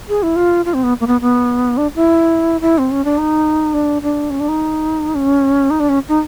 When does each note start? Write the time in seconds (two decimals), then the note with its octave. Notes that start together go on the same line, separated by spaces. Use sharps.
0.09 G#4
0.23 E4
0.36 F4
0.65 F4
0.74 C4
0.83 B3
1.00 A#3
1.07 B3
1.21 B3
1.77 D4
1.95 E4
2.61 E4
2.78 C4
2.91 C#4
3.05 D4
3.18 D#4
3.74 D4
4.02 D4
4.30 C#4
4.40 D4
4.48 D#4
5.15 C#4
5.70 D#4
5.80 D4
5.89 C#4
6.09 D#4